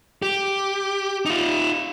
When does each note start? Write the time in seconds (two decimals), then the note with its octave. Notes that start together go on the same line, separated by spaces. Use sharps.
0.22 G4
1.26 D#4 F4